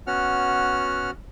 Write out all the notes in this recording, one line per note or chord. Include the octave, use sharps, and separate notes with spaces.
B3 C#4 F#4 F#5 F6